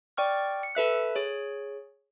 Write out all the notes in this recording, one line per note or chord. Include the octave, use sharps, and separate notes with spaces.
D5 G5 C#6 F6
C#7
A4 B4 E5 F#6
G#4 C#5